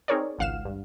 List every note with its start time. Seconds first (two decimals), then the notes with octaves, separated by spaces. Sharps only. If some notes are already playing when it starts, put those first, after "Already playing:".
0.08 C4 D#4 G#4 A#4 C#5 D5
0.39 G#1 C#2 F5 F#5 F6 E7
0.65 G2